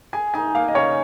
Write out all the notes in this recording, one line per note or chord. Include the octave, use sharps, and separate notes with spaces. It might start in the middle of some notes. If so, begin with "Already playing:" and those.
G#4 G#5
D#4 G#5
A#3 F5
D#5
C#3 C#5